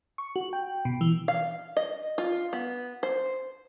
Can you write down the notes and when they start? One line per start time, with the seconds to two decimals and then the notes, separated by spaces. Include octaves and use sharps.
0.18 C#6
0.36 F#4
0.53 G5
0.85 B2
1.01 E3
1.28 F5
1.77 D#5
2.18 F4
2.53 B3
3.03 C5